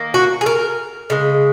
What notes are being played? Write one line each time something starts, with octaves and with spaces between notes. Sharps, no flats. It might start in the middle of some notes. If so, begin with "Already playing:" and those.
Already playing: D#3 A#3
F#4
G#4
A#4
C#3 G#3